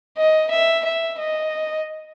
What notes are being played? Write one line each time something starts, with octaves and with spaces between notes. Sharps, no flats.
D#5
E5
E5
D#5